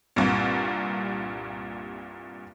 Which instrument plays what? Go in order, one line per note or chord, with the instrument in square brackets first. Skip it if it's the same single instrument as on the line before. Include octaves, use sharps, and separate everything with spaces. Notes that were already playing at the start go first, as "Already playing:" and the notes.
[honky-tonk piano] C2 G2 A#2